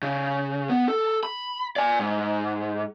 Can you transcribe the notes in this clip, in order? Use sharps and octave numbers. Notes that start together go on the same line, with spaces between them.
C#3
B3
A4
B5
D5 G#5
G#2